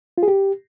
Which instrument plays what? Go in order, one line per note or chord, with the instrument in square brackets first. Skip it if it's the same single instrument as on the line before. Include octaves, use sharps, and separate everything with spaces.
[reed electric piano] F4
G#4
G4